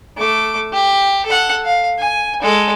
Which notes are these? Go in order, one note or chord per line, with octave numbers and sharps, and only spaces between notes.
A3 D6
G4
A4 F#5
F5
G#5
G#3 A4